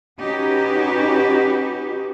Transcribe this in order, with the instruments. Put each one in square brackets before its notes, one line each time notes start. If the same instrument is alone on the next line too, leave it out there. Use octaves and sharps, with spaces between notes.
[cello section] C#4 D#4 F#4 G4 B4